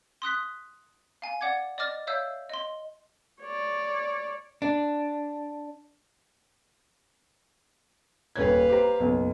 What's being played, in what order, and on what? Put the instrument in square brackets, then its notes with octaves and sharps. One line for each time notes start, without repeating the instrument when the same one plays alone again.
[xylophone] C6 D#6 F#6 B6
F5 G#5
D5 F#5 D6 G#6
D5 D#5 D6 F6 A6
C#5 E5 F5 E6 G6
D#5 C6
[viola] C#5 D5
[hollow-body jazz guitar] D4
[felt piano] D#1 C#5 G#6 [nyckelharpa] B4 F5
[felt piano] G4 C5 A#5
F#1 B1